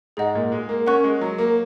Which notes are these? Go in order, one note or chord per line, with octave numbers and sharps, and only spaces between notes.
G#2 G#4 D#5 F#5
A#2
G#3
A#3
C#4 A#4 F#5 C#6 F#6
G#3
F#3
A#3